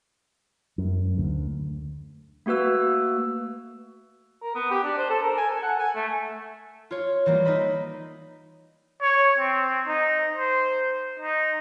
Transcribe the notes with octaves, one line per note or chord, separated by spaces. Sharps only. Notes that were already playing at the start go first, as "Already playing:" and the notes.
F#2
D2
A3 A#3 F#4 B4 E6
A#4
B3
G4
D4
C5
A4
A#4
G#5
A4
F#5
G#5
A3
F4 C#5
E3 G3 A#3 F4
D#4 D#5 B5
C#5
C4
D#4
C5
D#4